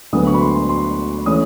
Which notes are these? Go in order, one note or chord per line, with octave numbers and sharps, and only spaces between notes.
D2 D3 F#3 B3 D#6
C#6
B5
C6
C6
C6
E3 A3 C#4 D#6